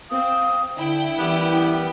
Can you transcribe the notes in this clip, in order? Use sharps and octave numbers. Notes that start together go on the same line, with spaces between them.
C4 F5 D#6
D3 E4 E5 G5
F#2 E3 G3 B3